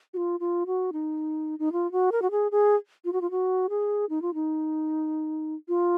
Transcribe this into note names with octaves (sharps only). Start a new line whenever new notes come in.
F#4
F4
F4
F#4
D#4
D#4
F4
F#4
A#4
F#4
G#4
G#4
F4
F#4
F4
F#4
G#4
D#4
F4
D#4
F4